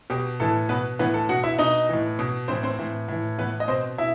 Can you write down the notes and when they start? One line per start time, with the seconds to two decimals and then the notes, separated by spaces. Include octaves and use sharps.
0.10 B2 G4
0.40 A2 E3 A4
0.69 B2 B3 B4
0.99 A2 E3 B3 B4
1.14 A4
1.29 B2 F#4 F#5
1.43 E4 E5
1.59 B2 D#4 D#5
1.89 A2 E3
2.19 B2
2.48 A2 E3 C4 C5
2.63 C4 C5
2.79 A2 E3
3.08 A2 E3
3.38 A2 E3 B3 B4
3.60 D#5
3.68 B2 C4 C5
3.98 B2 E4 E5